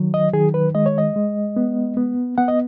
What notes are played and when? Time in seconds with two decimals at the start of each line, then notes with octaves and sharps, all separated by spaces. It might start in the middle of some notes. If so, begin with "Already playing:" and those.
Already playing: D#3 F#3
0.14 D#5
0.33 D#3 G#4
0.54 B4
0.75 G#3 D#5
0.86 C#5
0.98 D#5
1.16 G#3
1.56 B3
1.97 B3
2.38 B3 F#5
2.48 D#5